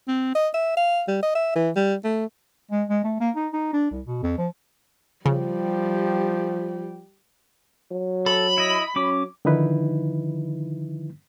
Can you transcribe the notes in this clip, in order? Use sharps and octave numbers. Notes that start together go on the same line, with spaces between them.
C4
D#5
E5
F5
G3
D#5
E5
E3
G3
A3
G#3
G#3
A3
A#3
D#4
D#4
D4
C2
B2
F2
F3
C#3 F3 G3 G4
F#3
A4 B5
E4 D#5
F#3 C#4 D6
D3 D#3 F3 D#4 E4 B4